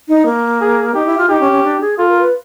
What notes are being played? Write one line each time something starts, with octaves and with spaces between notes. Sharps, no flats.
D#4
A#3
G#4
D#4 G4
E4
F4
D#4 G4
C#4
C#4
D4
G#4
F4 A4
A#4
B4